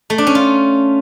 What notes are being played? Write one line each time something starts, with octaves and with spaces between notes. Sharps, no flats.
A3
D4
C#4
F4